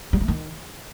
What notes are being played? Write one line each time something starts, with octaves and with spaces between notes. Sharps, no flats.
G3
A3
D#3